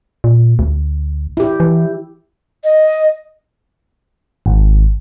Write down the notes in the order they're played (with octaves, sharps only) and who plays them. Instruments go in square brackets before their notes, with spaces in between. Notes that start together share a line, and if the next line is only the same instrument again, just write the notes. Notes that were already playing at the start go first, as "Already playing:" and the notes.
[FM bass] A#2
D2
[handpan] E4 G4
[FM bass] E3
[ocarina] D#5
[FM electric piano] G#1